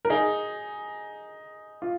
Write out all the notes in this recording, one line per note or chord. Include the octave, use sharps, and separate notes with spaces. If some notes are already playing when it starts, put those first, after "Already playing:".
A#4
D#4 G#4
F4